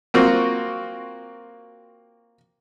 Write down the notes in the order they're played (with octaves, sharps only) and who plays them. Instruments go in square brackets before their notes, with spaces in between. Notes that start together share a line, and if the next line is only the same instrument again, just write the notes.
[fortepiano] A#3 C4 F4 F#4